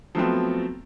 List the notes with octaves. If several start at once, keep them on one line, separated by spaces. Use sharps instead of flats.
F3 F#3 A3 B3 C4